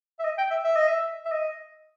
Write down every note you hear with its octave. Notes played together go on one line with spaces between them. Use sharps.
E5
D#5
G5
E5
E5
D#5
E5
E5
D#5